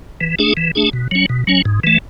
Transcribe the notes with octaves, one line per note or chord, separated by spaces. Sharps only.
E3
A3 D4 G#4
E3
A3 D4 G#4
B2
F#3 C#4
B2
F#3 C#4
G#2
E3 A3